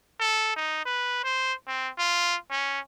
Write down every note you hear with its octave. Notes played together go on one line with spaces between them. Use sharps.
A4
D#4
B4
C5
C4
F4
C#4